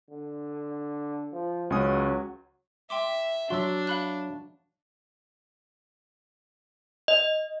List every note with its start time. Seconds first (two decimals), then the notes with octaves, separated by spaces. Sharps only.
0.10 D3
1.33 F3
1.70 C#2 F#3 C#4 D#6
2.90 E5 G5 C6 D6
3.50 F#3 D4 F#4 C6 E6
3.87 F5 B5 F#6
7.08 D#5